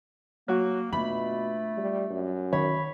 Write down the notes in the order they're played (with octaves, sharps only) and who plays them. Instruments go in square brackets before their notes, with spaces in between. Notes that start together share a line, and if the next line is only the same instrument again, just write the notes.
[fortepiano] F#3 F#4 [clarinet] A#3
[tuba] B2 [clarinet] A3 [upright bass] D4 F4 [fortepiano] B5
[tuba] G3
F#2
[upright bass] D#3 [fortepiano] C#5 [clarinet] B5